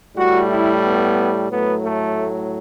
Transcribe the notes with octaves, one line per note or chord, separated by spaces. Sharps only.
A2 G3 F#4
E4
B3
A2 F#3 A3 B3
A3